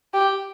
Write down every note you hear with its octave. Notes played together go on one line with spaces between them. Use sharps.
G4